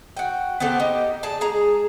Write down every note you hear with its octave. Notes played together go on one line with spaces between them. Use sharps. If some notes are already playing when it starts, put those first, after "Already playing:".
F#4 G5
B3 C4 G4 A4
D#4 G4 D#5
G#4 D5 A5
G#3 G#4 A#5